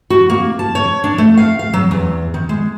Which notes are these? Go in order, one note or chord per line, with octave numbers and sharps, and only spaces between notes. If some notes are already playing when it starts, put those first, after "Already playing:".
F#4
A#3
A5
C#5
D4
A3
F5
F5
F#3
E2
D#3
G#3